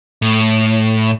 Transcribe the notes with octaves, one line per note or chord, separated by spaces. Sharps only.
A2